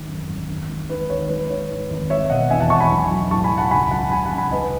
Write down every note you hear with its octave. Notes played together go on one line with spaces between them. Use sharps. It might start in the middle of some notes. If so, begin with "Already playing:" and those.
Already playing: G#1 D#3
F#2
G#1
D#2
G#3
D#3 B4
D#2 C#5
G#3 B4
D#3 C#5
G#2
G#1
G#3 C#5 E5
B2 D#5 F#5
E2 E5 G#5
F#5 A5
E1 A5 C#6
G#5 B5
B1
F#3
A2 A5 C#6
G#5 B5
B1
F#5 A5
C#2 G#5 B5
F#3 F#5 A5
C#3 G#5 B5
F#5 A5
C#2
G#5 B5
C#2 B4 D#5